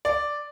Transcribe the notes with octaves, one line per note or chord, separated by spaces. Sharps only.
D5